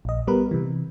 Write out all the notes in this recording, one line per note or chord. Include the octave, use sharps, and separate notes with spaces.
A#1 D#5
G3 B3 A#4 B4
C3 E3